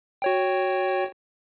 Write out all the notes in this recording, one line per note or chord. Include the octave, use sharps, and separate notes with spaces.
F#4 C#5 G5